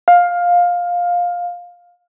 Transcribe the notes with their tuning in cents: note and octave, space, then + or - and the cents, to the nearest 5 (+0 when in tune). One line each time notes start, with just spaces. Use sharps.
F5 +15